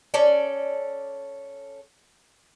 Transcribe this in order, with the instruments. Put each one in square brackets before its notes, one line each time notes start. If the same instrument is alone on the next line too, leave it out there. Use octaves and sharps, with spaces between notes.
[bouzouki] C#4 A4 D5